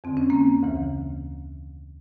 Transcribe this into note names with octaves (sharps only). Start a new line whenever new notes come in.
F2 D3 C4
C#4
A#3 C4
D2 C#3 E3